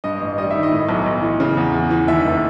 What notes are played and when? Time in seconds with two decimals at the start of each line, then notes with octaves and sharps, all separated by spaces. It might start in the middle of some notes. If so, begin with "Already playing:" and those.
0.04 G2 D#5
0.20 A1
0.38 G3 D#5
0.51 D#3 E5
0.63 D#5
0.72 A2
0.89 B1
1.06 B1
1.22 E3
1.40 C#3
1.57 E2
1.74 E2
1.91 E3
2.08 D#2 E5
2.25 F1